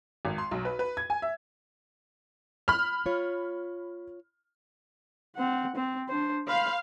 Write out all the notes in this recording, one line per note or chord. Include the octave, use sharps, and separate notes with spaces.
G#1
C6
B1
B4
B4
G#6
G#5
E5
B5 F6
F4 C#5
C4 F#5
C4
D4 C5
C5 F5 B5